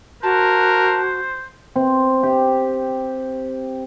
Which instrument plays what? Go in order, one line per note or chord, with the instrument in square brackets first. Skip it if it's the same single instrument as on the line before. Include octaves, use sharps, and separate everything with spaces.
[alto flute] F#4 [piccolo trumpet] A#4 [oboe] C5 [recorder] A5
[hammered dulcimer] C4
G4